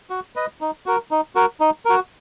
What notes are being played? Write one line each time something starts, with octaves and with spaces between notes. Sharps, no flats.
F#4
B4 D#5
D#4
F#4 A#4
D#4
F#4 A#4
D#4
F#4 A#4